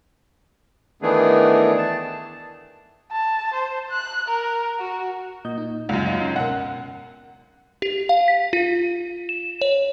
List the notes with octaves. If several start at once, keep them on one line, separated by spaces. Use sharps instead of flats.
D#3 E3 A3 B3 D4 G#4
A5
A5
C5
F#6
A#4
F#4
A#2 D#5 G6
D#4
C#2 F#2 F#5 A#5
D#4 C#5 D#5
C#3 C#4 C6
B2 A#4 F#5
G4
F5
B6
F4
E7
C#5